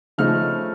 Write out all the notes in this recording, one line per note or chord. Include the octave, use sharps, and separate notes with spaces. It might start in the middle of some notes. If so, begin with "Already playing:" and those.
C#3 F3 A3 D#4 F6